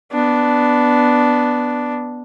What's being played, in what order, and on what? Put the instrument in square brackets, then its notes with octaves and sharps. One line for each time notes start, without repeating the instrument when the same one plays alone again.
[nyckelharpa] B3 D4